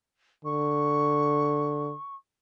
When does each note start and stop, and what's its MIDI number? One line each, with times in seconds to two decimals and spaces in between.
0.45 1.94 50
0.45 2.15 85